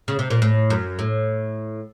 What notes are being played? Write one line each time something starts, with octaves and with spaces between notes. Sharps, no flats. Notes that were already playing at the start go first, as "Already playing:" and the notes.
C#3
C3
A#2
A2
F#2
A2